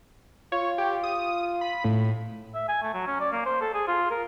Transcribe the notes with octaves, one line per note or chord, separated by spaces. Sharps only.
F4 C#5
G4
D#6
B5
A2
E5
G#5
A3
F#3
C#4
D5
A#3
C5
A4
G#4
F4
A#4